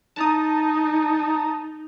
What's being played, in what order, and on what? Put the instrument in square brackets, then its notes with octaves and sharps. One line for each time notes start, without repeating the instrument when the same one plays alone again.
[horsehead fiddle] D#4 [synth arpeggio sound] A5 A#5 D#6